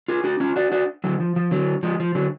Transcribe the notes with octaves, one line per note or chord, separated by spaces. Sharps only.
F4 G#4
D4 F#4
C#4 F4
D4 F#4
D4 F#4
D3 F#3
F3
F3
D3 F#3
F3 G#3
F3
D3 F#3